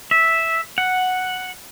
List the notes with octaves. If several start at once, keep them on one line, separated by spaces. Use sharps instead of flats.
E5
F#5